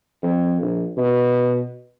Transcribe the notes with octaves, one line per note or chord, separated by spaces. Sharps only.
F2
A#1
B2